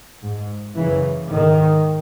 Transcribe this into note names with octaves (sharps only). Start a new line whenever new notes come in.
G#2
F#2 C#3 E3
G#2 D#3